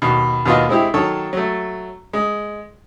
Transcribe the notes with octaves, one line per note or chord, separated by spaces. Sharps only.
D#2 B2
D#2 B2 B3 F4 D#5
G#3 C4 E4 G4
D#3 F#3 A4 C#5
F#3 A3
G#3